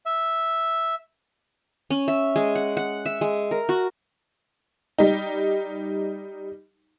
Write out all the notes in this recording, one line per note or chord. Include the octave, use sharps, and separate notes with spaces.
E5
C#4
E5
G#3
F#5
F#5
E5
G#3
A#4
F#4
G3 D#4